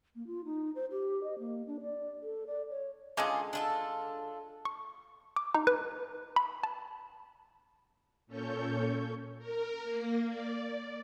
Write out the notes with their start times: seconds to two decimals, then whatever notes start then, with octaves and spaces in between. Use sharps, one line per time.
0.15 A#3
0.27 F4
0.45 D#4
0.75 C5
0.92 G4
1.23 D#5
1.39 A#3
1.67 D4
1.81 D5
2.22 A4
2.47 D5
2.70 C#5
3.17 D3 G#3 C#4 F4 G#4 C6
3.53 D4 F4 A4
4.65 C#6
5.36 D6
5.54 D#4
5.67 B4
6.36 B5
6.63 A5
8.27 A#2 C#4 A4 C#5 C#6 G6
9.39 A#4
9.83 A#3
10.27 D5